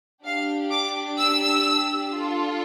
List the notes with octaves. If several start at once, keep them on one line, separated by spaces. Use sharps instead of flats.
D4 G4 F5
D6
E6
D4 F4 A4